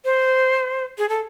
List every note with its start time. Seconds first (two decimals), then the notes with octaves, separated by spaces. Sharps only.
0.05 C5
0.98 G#4
1.09 A4